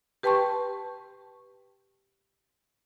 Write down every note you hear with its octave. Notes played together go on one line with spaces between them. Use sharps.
G4 B4 G5 A5 C6 C#6